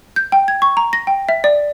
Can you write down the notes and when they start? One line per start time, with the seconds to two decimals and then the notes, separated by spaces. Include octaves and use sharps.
0.16 G6
0.32 G5
0.48 G#6
0.62 C#6
0.77 A#5
0.93 A#6
1.07 G5
1.29 E5
1.44 D5